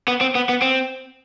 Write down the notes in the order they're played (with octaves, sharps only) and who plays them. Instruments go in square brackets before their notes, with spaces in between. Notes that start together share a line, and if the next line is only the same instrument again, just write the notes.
[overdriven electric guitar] B3
C4
B3
B3
C4